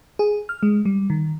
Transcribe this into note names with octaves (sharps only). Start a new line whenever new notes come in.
G#4
F6
G#3
G3
D#3